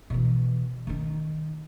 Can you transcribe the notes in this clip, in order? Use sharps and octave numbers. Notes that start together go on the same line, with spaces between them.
B2 E3
D#3 D#4